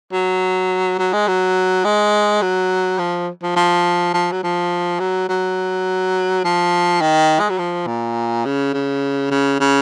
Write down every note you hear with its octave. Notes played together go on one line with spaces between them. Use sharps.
F#3
F#3
G#3
F#3
G#3
F#3
F3
F3
F3
F3
F#3
F3
F#3
F#3
F3
D#3
G#3
F#3
F3
A#2
C#3
C#3
C#3
C#3